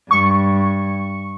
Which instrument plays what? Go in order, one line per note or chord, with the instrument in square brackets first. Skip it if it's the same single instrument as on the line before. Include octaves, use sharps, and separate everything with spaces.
[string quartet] G2 [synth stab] C#6